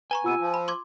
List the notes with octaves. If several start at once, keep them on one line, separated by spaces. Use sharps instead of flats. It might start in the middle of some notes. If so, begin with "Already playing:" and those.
B4 G#5 A#5 C#6
C3 B3 F4 E6 D#7
F3
B5
C6 D6 G#6